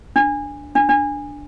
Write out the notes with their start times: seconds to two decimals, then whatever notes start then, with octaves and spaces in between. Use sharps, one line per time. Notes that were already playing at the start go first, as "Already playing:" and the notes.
0.16 D4
0.75 D4
0.89 D4